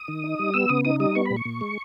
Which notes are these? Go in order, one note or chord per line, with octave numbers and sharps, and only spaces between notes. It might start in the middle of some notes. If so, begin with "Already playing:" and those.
Already playing: D#6
D#3
D#4
G3
B3 E6
C#3 D#6
D#4 D#6
G3 D#6
B3 C#6
B5
A#2
C#6
A#2
G#3